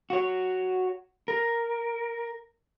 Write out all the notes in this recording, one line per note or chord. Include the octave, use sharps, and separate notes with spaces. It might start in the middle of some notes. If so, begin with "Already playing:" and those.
F#4 C#5
A#4